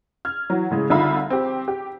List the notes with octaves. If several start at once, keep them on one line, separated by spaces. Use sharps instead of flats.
F6 G#6
E3 F#3
A2 C#3 G#3
C2 D3 D#4 F4 E5 B5
C4 G4
G4